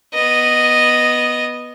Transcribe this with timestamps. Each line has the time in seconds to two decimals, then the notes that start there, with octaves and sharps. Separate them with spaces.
0.14 B3 D#5